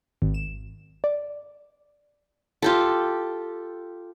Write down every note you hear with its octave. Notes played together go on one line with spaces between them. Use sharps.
G#1
E7
D5
F4 G4 A4